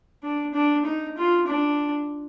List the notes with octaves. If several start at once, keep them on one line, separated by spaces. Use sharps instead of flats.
D4
D4
D#4
F4
D4